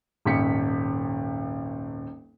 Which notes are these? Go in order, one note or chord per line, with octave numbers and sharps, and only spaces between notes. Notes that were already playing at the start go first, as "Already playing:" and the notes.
D#1 G#1 C#3 B6 C#7